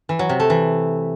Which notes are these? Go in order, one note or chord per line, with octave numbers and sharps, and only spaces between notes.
E3
F#3
C3
A3
E3